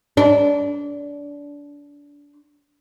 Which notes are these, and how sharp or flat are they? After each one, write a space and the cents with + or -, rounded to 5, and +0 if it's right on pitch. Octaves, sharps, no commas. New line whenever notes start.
D4 -25